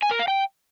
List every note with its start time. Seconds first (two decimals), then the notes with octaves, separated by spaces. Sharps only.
0.02 G#5
0.11 A#4
0.19 F5
0.28 G5